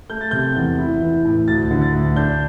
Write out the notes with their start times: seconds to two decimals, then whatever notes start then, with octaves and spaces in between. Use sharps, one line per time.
0.10 A3 G6
0.21 A6
0.31 C3 G6
0.55 E2
0.78 E4
1.02 E3
1.24 A2
1.48 D2 A6
1.70 D3
1.82 A6
1.93 D2
2.16 D4 G6